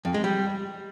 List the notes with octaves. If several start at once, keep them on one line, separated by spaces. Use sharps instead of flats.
F2
G#3
G3